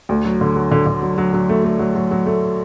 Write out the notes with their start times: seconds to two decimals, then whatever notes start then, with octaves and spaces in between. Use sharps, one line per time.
0.09 D2
0.24 F#3
0.41 D3
0.56 F#3
0.71 D3
0.86 D3
1.02 F#3
1.18 F#3
1.34 F#3
1.49 A3
1.64 A3
1.79 F#3
1.95 F#3
2.11 F#3
2.26 A3